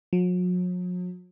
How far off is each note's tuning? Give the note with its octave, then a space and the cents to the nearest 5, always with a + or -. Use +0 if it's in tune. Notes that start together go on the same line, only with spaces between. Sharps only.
F#3 -45